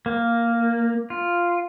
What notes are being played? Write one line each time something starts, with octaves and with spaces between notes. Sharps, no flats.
A#3
F4